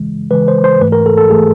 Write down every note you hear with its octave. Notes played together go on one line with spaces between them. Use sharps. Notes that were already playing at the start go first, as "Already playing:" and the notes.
Already playing: C#3 E3 G#3
C#3 E3 G#3 B4
C5
C5
G#2 E3 A3 B4
A#4
A4
A4
E3 A3 G#4